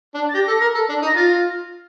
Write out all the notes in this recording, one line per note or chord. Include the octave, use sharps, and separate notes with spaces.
D4
A6
G4 A#6
A4
A#4
A4
D4
D#4
A#6
F4 A6
A#6